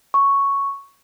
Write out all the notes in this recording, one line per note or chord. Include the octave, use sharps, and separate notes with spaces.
C#6